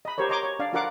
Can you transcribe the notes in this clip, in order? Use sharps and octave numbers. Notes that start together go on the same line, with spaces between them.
D#5 B5
G4 A#4 C5 C#5
C#5 D#5 A#5 C6 D6
C#5
D4 D5 F5
D4 F4 A#4 F5 F#5 D6